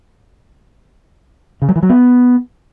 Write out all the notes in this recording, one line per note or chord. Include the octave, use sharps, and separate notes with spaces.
C#3
F#3
E3
F#3
B3